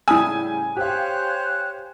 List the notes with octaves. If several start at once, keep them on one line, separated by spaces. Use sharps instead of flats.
A2 C#3 G3 E4 G#5 D#6 E6
G4 C5 C#5 F5 F#6